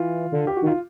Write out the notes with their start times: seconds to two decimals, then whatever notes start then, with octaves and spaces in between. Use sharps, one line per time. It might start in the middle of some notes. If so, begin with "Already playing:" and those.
Already playing: E3 F4
0.32 D3
0.47 G4
0.57 F#4
0.62 D#3
0.67 F4